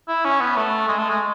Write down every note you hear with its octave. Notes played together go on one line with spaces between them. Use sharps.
E4
C#4
B3
A3
G#3
A3
G#3